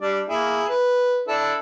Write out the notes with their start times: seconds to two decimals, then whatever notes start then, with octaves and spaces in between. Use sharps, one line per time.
0.01 G3 D4 D5
0.29 A#3 E4 G#4
0.69 B4
1.28 D4 E4 A4